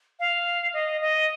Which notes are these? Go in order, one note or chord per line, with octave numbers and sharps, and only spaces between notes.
F5
D#5
D#5